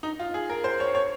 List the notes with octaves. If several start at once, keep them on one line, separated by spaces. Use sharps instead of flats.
D#4
F4
G#4
A#4
C5
C#5
C#5